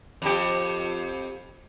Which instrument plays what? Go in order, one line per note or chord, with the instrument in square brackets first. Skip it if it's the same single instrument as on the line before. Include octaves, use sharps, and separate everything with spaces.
[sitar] F2 G4